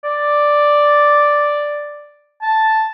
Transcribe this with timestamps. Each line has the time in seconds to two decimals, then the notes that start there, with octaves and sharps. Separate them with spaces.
0.04 D5
2.42 A5